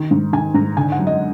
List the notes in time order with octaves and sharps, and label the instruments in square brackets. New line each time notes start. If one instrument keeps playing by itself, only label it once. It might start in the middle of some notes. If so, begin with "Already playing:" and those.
Already playing: [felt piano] D#3
G#2
D#3 G#5
G#2 A#5
D3 G#5
F#5
F#2
D#5